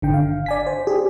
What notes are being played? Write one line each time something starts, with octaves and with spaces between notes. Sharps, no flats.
G1 D3 G5
F5
D5 G#5 B6
C5
G4 G#4